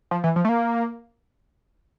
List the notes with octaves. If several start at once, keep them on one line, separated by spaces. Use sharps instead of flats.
F3
E3
F3
A3
A#3